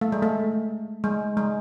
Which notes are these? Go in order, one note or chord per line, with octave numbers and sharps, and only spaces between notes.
A3
G#3
A3
G#3
G#3